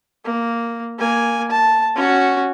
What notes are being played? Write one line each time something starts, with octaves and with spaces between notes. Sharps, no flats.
A#3
A#3 G#5
A5
C#4 F#4